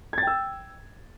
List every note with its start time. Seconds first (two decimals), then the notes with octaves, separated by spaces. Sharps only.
0.13 G#6
0.18 A6
0.23 G5
0.27 E6